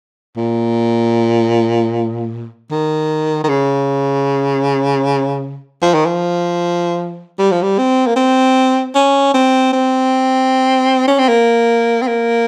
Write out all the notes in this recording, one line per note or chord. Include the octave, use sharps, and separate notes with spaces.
A#2
D#3
D#3
C#3
F3
D#3
F3
G3
F3
G3
C4
A#3
C4
C#4
C4
C4
C#4
C4
A#3
C4
A#3